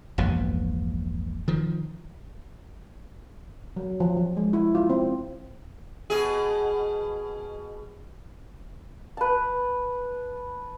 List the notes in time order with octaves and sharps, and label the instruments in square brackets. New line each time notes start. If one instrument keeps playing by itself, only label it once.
[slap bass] E1 A#1 G2 B2
D#3 F3
[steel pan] F#3
F3
F3
G#3
E4
F4
C4
[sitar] B2 G#4
[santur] B4 A5